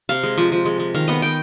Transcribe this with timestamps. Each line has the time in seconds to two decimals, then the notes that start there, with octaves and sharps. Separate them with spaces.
0.09 C3 F5
0.23 G#3
0.38 F3
0.52 F3
0.66 G#3
0.79 G#3
0.94 D#3 F5
1.08 B3 D#5
1.22 B3 G5